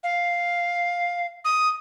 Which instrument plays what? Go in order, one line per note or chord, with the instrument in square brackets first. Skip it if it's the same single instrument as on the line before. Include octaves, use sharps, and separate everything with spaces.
[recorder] F5
D#6